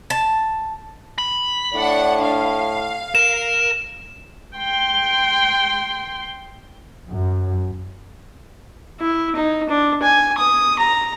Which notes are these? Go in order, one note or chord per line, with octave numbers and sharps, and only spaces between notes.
A5
B5
A2 D4 F#5
F5
A#4 E7
G5 C6
F#2
E4
D#4
D4
G#5
D#6
A#5